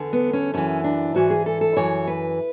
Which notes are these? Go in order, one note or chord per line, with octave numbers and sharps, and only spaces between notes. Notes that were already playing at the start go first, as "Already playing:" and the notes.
Already playing: E2 D3
B3
C#4
F#2 E3 C#4
D4
G#2 E3 F#4
G#4
A4
A4
F#2 E3 C#5
B4